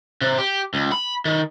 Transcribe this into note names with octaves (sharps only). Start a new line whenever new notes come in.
C3
G4
C#2
B5
D#3